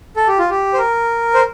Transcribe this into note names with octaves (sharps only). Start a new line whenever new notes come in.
A4
G4
F4
G4
C5
A#4
C5